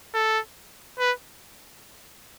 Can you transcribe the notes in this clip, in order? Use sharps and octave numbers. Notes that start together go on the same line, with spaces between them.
A4
B4